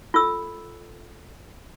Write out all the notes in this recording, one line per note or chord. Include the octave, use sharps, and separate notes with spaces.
F4 A4 E6